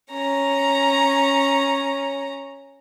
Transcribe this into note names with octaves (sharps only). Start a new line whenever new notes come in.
C#4 A#5